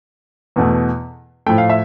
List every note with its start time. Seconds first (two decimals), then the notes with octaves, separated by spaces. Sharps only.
0.56 E2 B2 A3
1.46 A2 F3 A3 G5
1.58 F5
1.70 E5